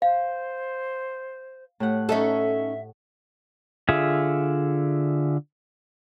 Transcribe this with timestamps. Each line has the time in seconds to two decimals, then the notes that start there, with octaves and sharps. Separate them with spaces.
0.02 C5 F5
1.80 A2 G4 F#5
2.09 C#4 D#4 A4 D#5 E5
3.89 D3 F4 G#4 E5